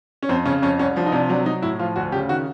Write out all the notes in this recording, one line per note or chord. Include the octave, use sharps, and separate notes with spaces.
C#4
F2 C4
C#3 C#4
F2 C#4
C2 C#4
F3 D4
D#4
C3 D4
F#3 D4
F#3 D#4
A2 E4
F3 F4
D2 F#4
C#3 G4
D#3 F#4